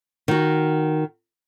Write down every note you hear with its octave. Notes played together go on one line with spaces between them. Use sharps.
D#3 F#4